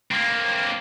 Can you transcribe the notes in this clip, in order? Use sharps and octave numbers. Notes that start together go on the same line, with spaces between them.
A#3 C4